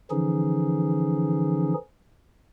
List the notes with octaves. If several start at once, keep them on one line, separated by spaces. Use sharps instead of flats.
D3 E3 F3 C#4 D#4 G#4